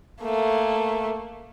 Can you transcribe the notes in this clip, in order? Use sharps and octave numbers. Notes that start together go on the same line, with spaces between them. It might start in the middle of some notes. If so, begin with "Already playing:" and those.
A3 A#3